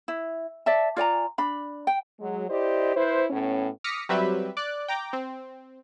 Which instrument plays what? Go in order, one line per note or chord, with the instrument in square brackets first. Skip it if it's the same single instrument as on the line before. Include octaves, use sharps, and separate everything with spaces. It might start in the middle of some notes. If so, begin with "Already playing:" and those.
[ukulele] E4
D5 E5 A5
F4 D5 G#5 A#5
D4 B5
G5
[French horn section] F#3 G#3
E4 G4 C5 D5 D#5
E4 B4 C5
A2 B3 C#4
[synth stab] D6 D#6 F6 A#6 B6 C#7
F#3 G3 C4 G4 B4 E5
D5 F#6
G5 A#5 D6
C4